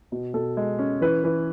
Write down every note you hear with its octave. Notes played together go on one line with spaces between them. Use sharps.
B2
B2 A4
G#3
C#4
E3 B4
E3 B4